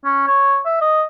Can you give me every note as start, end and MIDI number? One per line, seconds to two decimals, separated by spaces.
0.05 0.24 61
0.27 0.60 73
0.66 0.79 76
0.81 1.03 75